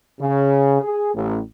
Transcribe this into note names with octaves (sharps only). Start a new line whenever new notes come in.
C#3
G#4
A1